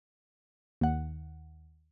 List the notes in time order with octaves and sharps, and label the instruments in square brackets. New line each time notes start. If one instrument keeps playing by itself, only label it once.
[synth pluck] D#2 F#5